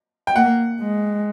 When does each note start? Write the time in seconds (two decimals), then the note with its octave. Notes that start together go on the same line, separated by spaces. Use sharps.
0.27 G5
0.36 A#3 F#5
0.81 G#3